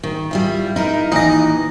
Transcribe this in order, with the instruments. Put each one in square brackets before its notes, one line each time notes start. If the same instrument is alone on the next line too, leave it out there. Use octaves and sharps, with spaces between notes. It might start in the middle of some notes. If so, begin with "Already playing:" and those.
[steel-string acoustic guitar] D#3
G3 E4 F4
D#4 E4 A#4
[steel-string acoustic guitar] D#2 E3 [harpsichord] D#4 D#5